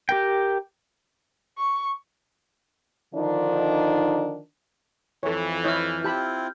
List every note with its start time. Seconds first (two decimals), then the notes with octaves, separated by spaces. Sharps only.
0.09 G4 A#4 G5
1.58 C#6
3.14 D3 D#3 F3 D4 D#4
5.23 F2 E3 A4 C#5
5.64 E4 C#5 D#5 F6 G6
6.04 C4 E4 F4 G4 A5 B5 G6